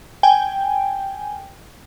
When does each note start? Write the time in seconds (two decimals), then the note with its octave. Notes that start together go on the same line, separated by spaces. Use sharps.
0.23 G5 G#5